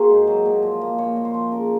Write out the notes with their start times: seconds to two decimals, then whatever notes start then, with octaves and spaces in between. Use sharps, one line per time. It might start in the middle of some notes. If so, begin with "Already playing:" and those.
Already playing: A#3 F#4 G#4 A#4 C5
0.10 G#2
0.27 F#3
0.45 A#2
0.63 F3
0.81 A#3
0.98 A#2 C#5
1.16 A#2
1.25 C5
1.34 F3
1.52 C#3 A#4